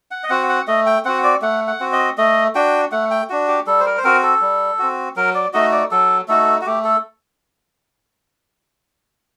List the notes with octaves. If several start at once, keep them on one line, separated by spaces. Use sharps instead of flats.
F#5
D#5
C4 F#4 F#5
F#5
A3 D#5
G5
C4 F#4 F#5
D5
A3 F#5
F#5
C4 F#4
D#5
A3 D#5
D4 F#4 G5
A3 F#5
G5
D4 F#4
G4
G3 A4
C5
A#4
C5
C4 F#4 A#4
A4
G3
C4 F#4
F#3 A#4
D5
A3 D#4 F#4 D#5
D5
F#3 A4
A3 D#4 F#4 A4
F#4
A3 G4
A4